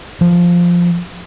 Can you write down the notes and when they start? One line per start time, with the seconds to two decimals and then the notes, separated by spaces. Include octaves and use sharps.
0.21 F3